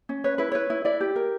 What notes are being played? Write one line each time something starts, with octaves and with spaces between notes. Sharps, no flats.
C#4
B4 C#5
E4 B4
B4 C#5
E4
E4 D5
G4
A#4